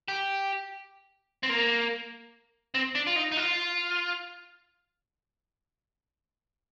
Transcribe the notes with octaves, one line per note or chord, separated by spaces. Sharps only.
G4
C4
A#3
C4
D4
F4
D#4
D#4
F4